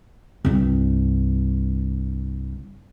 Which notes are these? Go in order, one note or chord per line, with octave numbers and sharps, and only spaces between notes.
C2 G2